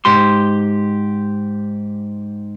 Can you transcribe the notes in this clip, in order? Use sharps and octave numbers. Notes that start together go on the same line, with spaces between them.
G#2 G4 C6